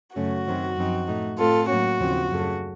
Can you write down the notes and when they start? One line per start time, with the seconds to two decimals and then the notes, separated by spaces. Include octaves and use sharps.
0.16 F#2 C#3 A3 C#4 F#4
0.47 F#2 D#3 F#3 C4
0.77 F#2 F3 C4 D#4
1.07 A2 A3 D#4
1.38 A2 A3 C4 F4 A4
1.68 A2 F#3 A#3 C#4 F#4
2.00 D#2 C#3 F3 C4
2.30 F#2 C#3 A3